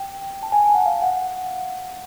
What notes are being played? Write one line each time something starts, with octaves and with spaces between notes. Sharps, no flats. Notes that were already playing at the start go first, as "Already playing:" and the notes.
Already playing: G5
A5
G#5
G#5
F#5
F5
F#5